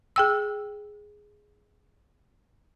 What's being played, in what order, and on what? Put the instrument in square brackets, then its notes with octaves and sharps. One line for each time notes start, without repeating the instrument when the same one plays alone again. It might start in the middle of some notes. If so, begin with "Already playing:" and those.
[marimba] G#4 G5 E6